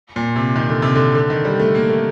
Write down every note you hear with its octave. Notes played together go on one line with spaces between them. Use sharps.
A#2
C3
D#3
D3
C3
D3
D3
D#3
G3
A3
A#3
A3